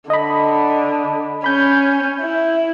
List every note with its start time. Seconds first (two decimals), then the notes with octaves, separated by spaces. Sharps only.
0.10 D3 D#5 B5
1.44 C#4 B5 G6
2.21 E4